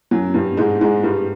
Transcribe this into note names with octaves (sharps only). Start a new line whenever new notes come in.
F#2 F#3
G2 G3
G#2 G#3
G#2 G#3
G2 G3